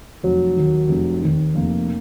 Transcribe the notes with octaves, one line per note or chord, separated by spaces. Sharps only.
F1 F#3
D#2 D#3
F1
D#2 D#3
F1 A#3